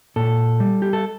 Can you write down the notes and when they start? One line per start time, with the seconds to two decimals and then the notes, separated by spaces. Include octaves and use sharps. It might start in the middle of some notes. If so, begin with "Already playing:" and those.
0.16 A#2 A4
0.60 G3
0.82 G4
0.93 A4